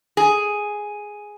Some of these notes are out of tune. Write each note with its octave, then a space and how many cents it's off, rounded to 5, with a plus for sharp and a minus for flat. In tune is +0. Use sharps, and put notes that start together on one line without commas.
G#4 +0